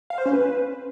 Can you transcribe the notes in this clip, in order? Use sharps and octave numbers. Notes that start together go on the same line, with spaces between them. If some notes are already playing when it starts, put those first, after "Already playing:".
F5
C5
C#4
B4